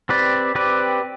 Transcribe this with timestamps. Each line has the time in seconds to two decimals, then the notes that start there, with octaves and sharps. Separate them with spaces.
0.09 C4 G4 B4 D5
0.55 C4 G4 B4 D5